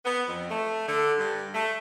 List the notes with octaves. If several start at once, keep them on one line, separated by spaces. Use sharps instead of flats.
B3
F2
A3
D3
G2
A3